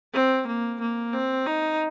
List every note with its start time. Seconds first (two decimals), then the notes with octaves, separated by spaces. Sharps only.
0.13 C4
0.47 A#3
0.80 A#3
1.13 C4
1.46 D#4